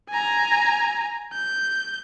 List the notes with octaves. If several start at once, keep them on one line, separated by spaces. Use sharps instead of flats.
G#5 A#5
G6